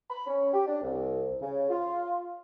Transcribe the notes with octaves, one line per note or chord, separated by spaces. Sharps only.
B5
C#4
G4
D4
C2
C#3
F4